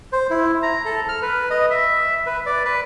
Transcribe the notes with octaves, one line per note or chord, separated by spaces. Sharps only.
C5
E4
A#5
A4
F6
B4
D#5
E5
B4
D5
B4